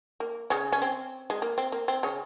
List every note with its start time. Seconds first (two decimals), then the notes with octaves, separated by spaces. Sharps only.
0.20 A#3
0.50 C#3 C#4
0.72 C#4
0.82 C4
1.30 G#3
1.42 A#3
1.58 C4
1.72 A#3
1.88 C4
2.03 C#3 C#4